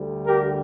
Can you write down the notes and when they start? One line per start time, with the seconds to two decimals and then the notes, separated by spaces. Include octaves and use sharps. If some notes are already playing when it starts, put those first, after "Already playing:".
Already playing: D2 D3 G3
0.26 G4 A#4